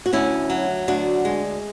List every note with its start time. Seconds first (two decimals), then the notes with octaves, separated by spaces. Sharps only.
0.06 F#4
0.13 D2 C#4 E4
0.50 F#3
0.88 D2 D4 F#4
1.25 G#3